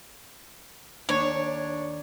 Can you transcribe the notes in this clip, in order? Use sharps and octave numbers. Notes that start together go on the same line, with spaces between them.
D#2 D4 C#5